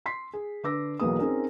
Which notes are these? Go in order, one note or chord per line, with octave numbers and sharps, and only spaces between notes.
C6 B6 C7
G#4
D3 B4 D6 E6 A#6
B1 E3 A#3 B3 G#4 D#6
C4 C#4 D#4 G#4 A#4